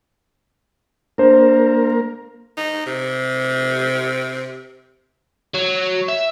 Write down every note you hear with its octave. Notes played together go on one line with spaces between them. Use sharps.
A#3 D4 A#4 C5
D#4
C3
F#3
E5